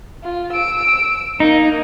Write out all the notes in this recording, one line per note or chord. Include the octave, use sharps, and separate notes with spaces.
F4
E6 D7
A#3 D#4